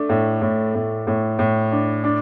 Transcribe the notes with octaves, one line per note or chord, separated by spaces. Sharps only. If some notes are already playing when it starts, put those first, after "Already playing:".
Already playing: A3 D4
A2
A2
A2
A2
A2
D4
D4